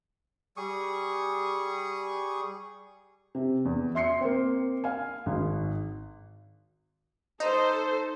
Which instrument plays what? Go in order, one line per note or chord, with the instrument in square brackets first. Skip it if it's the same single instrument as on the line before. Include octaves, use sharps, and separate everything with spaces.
[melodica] G3 G#4 C#6 D#6
[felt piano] C3
E2
E5 C6 C7 C#7
A#3 C4
F5 G#5
G#1 G#2
[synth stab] D#4 [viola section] A4 C5